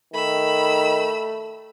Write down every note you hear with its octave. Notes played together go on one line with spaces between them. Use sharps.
D#3 A3 B5 E6